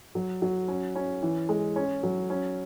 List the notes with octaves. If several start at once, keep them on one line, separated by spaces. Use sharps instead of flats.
F#3
F#3
C#4
C#4
E3
G#3
C#4
F#3
C#4